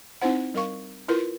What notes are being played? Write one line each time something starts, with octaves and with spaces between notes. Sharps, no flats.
C4 D#4 E4 C5 F#5
G3 A#4 F5 C#6
E4 F4 A#4 B4